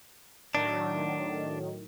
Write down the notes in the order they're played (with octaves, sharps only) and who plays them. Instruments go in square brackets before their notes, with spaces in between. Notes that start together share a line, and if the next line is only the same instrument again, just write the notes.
[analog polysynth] A2 D#3 F#3 [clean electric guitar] D4